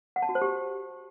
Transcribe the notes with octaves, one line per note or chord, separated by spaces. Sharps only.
F#5
A5
F#4
C5
G4